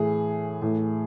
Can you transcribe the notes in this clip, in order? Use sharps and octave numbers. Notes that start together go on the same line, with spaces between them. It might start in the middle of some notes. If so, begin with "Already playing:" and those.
Already playing: A2 E3 G#4
A2 E3